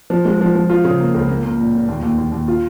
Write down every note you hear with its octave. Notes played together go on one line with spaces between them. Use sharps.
F3
G#3
F3
F3
F4
C#3
A#3
C#2
A#3
A#3
A#2
A#2
D#2
D#2
D#2
D#2
F4